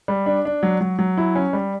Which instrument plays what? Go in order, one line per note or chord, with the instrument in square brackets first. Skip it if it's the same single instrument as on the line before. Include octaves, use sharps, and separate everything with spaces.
[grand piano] G3
D4
D4
F#3
F#3
F#3
E4
C#4
G3